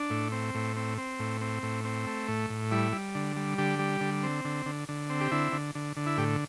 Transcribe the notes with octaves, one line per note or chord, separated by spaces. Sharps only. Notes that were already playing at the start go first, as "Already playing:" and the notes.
Already playing: D4
A2
C4
A2
C4
C4
A2
C4
A2
C4
A3
A2
A2
G3 E4
G3
D3
G3
D3 G4
G3
D3
C4
D3
D3
D3
C4
G4
D3 E4
D3
D3
D3
E4
A2 G4